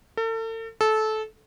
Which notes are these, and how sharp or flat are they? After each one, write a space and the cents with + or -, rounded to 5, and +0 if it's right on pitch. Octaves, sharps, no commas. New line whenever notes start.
A4 +40
A4 -20